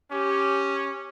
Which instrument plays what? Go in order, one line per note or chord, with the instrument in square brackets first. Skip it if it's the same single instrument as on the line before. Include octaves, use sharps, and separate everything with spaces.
[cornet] C#4 [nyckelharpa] G4